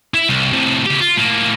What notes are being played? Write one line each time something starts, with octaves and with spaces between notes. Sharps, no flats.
E4
C2
A2 C3
C#3 G4
F4
A2 A#3